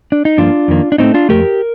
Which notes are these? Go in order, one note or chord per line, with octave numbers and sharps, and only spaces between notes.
D4
D#4
G2 F3 A#3 D4 F4
F2 D#3 A#3
D4
A2 A3 C4 D#4
D4 F4
F2 D#3 A3 G4 A#4